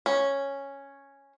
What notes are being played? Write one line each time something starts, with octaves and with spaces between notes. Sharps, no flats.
C#4